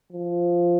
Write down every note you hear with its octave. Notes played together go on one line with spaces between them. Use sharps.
F3